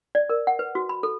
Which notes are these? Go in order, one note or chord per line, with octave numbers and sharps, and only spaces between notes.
D5
A#4
F#5
B4
F#4
B5
A4